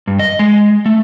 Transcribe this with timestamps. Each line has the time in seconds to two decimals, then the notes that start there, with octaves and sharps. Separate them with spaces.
0.08 G2
0.19 D#5
0.39 G#3
0.86 A3